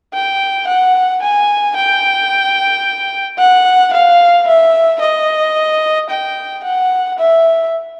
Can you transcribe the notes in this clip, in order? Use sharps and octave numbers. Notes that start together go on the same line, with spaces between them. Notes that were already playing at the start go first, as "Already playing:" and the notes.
G5
F#5
G#5
G5
F#5
F5
E5
D#5
G5
F#5
E5